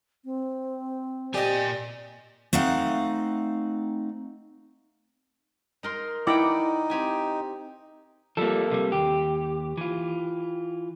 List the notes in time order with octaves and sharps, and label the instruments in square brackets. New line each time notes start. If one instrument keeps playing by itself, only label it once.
[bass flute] C4
[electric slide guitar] A#2 G#5 [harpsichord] G4 D#5 [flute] D5
[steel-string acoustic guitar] A3 C4 D#4 F5 F#5
[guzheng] D#4 A#4 C6
[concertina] D#4 [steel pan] E4 D6 [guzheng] D5 F#5 G5
[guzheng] C4 G4 G#5
[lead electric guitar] F3 G3 [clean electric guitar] A#3 A4
[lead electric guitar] C3 G3
[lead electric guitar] D#2 [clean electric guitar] G4
[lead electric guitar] E3 F4